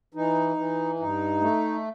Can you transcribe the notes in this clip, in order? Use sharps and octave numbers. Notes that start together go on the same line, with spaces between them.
E3 D#4
E3
G2 D#4
A3